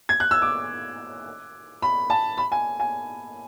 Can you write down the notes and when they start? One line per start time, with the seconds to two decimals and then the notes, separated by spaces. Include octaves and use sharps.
0.09 G#6
0.20 F#6
0.31 E6
0.42 D6
1.82 B5
2.10 A5
2.38 B5
2.52 G#5
2.80 G#5